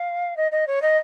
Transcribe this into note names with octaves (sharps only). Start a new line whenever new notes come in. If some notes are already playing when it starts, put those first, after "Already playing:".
Already playing: F5
D#5
D#5
C#5
D#5